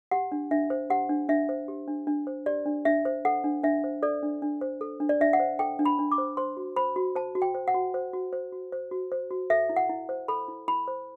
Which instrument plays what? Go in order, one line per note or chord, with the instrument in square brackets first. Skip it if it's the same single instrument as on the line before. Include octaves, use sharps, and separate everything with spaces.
[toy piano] G4 F#5
D4
D4 E5
C5
G4 F#5
D4
D4 E5
C5
G4
D4
D4
C5
G4 D5
D4
D4 E5
C5
A4 F#5
D4
D4 E5
C5
A4 D5
D4
D4
C5
A4
D4
D5
D4 E5
F#5
C5
A4 G5
D4
B5
D4
D6
C5
C5 C6
F#4
C5 B5
F#4
C5 A5
F#4
G5
C5
F#5
F#4
C5
F#4
C5
F#4
C5
F#4
C5
F#4
A4 E5
E4
F#5
E4
C5
A4 B5
E4
E4 B5
C5